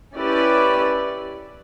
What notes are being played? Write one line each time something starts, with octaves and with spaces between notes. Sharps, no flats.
C#4 E4 G4 B4 D5